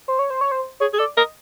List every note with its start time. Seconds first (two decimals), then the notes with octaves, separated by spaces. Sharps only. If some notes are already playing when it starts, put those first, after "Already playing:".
0.08 C5
0.19 C#5
0.30 C5
0.41 C#5
0.52 C5
0.80 G#4 C#5
0.93 G#4
0.99 A4 D5
1.17 A#4 D#5